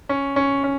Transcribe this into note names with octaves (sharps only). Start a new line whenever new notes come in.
C#4
C#4
C#4